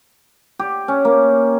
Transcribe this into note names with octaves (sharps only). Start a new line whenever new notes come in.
G4
C#4
A#3